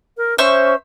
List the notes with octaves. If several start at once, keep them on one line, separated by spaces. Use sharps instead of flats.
A#4
C#4 C5 E5 C#6